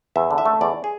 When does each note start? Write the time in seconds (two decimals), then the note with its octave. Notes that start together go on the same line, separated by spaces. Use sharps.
0.16 E2 E5
0.31 D3
0.38 E5
0.45 A3
0.61 E2 D5
0.84 G#4